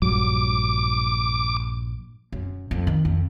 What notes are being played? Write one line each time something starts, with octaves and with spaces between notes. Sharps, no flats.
A#1 G2 F#3 D6
F#2
F2
D#3
F2